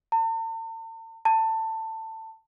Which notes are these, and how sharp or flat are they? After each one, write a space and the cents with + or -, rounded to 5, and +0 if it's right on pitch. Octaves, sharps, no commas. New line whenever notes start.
A5 +45
A5 +20